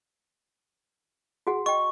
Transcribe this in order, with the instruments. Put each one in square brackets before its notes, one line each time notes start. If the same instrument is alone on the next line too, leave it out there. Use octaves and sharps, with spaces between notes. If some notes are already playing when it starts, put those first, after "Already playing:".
[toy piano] F#4 G#4 F#5
[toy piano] D#5 G5 [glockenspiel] C#6